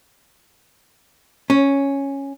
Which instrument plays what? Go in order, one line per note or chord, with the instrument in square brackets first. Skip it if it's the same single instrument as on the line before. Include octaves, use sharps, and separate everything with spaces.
[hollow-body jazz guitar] C#4